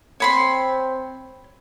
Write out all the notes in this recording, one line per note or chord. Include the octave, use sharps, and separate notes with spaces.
C4 C#5 B5 C6